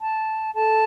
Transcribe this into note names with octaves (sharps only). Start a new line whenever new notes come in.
A5
A4 A5